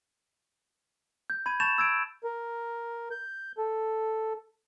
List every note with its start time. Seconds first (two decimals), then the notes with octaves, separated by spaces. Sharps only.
1.30 G6
1.46 B5 G#6 D#7
1.60 A5 C#6 G6 A6 E7 F7
1.78 E6 G#6 D7
2.24 A#4
3.11 G6
3.58 A4